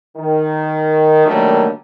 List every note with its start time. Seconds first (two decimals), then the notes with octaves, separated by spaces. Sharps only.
0.16 D#3
1.26 D3 D#3 F#3 G3 A3 A#3